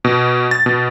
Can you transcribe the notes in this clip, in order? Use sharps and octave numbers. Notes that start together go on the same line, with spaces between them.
B2
A6
B2